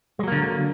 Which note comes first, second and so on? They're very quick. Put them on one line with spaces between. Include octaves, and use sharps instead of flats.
G#3 F#3 A#3 D3